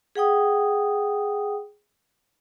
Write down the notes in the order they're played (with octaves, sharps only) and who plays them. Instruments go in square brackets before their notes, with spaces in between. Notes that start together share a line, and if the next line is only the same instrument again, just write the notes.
[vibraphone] G#4 F#5 G5 D#6